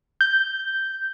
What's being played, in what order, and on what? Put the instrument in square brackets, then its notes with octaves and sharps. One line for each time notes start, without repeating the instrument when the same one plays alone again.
[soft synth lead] G6